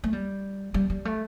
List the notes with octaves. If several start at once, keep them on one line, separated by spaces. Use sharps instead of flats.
A3
G3
G3
G3
A3